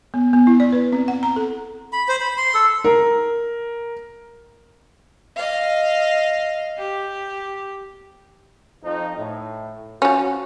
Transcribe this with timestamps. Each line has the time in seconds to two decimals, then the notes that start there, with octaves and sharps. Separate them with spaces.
0.14 B3
0.33 B3
0.47 E4
0.60 D5
0.73 B4
0.92 C4
1.08 F#5
1.23 A#5
1.36 A4
1.93 B5
2.08 C5
2.20 B5
2.37 C6
2.54 A4
2.84 A#4
5.35 D#5 F5
6.77 G4
8.84 F2 F3 D#4
9.17 A2
10.02 F3 C#4 F#4